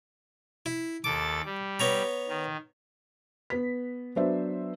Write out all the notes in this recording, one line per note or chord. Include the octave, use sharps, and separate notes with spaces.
E4
D#2 A4 D6 A6
G3
B3 C#5 A#5
D#3
B3 B6
F#3 B3 D4 B4 C5 E5